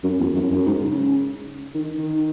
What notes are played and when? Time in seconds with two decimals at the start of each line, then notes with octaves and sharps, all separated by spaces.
0.04 F#2
0.19 E2
0.35 F#2
0.50 F#2
0.66 G#2
0.81 C#3
1.74 D#3
1.98 D#3